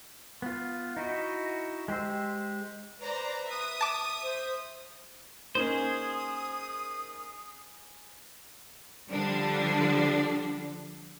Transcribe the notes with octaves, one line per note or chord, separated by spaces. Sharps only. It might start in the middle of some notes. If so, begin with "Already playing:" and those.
B3 F4
D#4 E4 F#4 D#5
G#3 G4 C5 E6
B4 C5 D5 A#5
E5 D#6
A5 D6
C5
A#3 C#4 D#4 G#4 C5 D#6
D3 F3 G3 D4